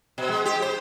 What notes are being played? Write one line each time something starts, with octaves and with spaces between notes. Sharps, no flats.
B2
G#3
G4
C5